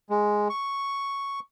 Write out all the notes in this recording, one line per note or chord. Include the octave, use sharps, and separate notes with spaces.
G#3
C#6